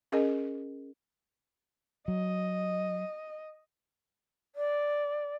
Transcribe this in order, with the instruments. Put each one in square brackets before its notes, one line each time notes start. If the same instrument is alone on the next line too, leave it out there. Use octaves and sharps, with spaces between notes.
[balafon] C#4 G#4 A#4 D#5
[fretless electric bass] F#3 [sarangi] D#5
[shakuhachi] D5